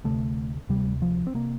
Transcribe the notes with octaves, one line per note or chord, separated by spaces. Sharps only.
D2 C3 A3
D2 C3 G3
F3
C4
C3 A#3